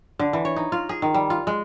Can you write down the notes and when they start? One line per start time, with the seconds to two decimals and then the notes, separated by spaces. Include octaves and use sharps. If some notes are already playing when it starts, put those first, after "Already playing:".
0.19 D3
0.33 E3
0.45 C#5
0.56 D#4
0.72 F4
0.89 G#4
1.02 D#3
1.14 G3
1.30 F4
1.47 G#3